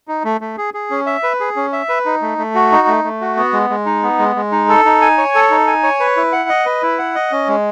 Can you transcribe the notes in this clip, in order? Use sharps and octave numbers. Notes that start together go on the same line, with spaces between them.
D#4
A3
A3
G#4
G#4
C#4
E5
B4
G#4
C#4
E5
B4
D#4
A3
A3
F#4
D#4
A3
A3
F#4
B3
G#3
G#3
D#4
B3
G#3
G#3
D#4
A4
D#4
G#5
C#5
A4
D#4
G#5
C#5
B4
E4
F#5
D#5
B4
E4
F#5
D#5
C#4
G#3